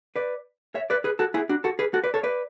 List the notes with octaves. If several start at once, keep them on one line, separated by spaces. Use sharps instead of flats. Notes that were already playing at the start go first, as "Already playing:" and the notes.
B4 D5
C#5 E5
B4 D5
G#4 B4
F#4 A4
E4 G#4
D4 F#4
F#4 A4
G#4 B4
F#4 A4
B4 D5
A4 C#5
B4 D5